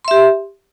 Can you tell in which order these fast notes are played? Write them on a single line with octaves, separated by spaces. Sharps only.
C6 E5 G4